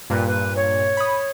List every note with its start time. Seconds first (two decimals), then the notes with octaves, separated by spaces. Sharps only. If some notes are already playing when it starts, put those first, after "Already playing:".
0.10 G2 A#2 B4
0.27 B4
0.56 C#5
0.97 B5 D#6